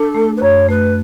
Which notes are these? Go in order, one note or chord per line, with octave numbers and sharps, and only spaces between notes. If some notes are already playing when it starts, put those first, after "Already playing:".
Already playing: D4 A4
A3
B4
F#2 C#5
A3 B4